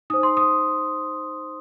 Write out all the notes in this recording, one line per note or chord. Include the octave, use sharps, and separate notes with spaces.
D#4 C5 D#6
C6
D#6